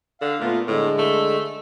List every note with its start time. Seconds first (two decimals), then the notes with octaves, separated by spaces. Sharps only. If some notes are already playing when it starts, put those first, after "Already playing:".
0.21 D3 F5
0.40 A#2 A3 B3 F4
0.68 A2 D3 G#3
0.99 A3